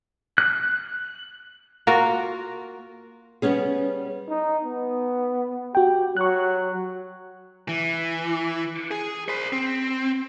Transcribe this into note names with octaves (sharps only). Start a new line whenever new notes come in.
F#6
A#3 F4 F#4 A#4
G3 B3 C#4 G#4
D#4
B3
F#4 G4 G5
F#3 C#6 F#6
E3
G#4
C5 B5
C4